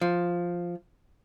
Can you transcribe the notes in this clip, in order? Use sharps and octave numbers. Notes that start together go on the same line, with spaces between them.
F3